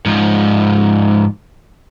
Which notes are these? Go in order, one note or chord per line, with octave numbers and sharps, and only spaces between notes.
G#2 F3